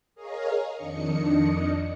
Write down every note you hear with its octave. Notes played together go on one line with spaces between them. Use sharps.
G#4 A#4 C#5 D#5 F5
F2 D#3 D4 D#5 C#7